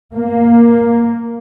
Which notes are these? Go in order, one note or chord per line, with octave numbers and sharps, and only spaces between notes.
A#3